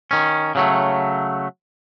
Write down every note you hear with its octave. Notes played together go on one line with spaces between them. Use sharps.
D#3 C#4
C#3 F#3 A3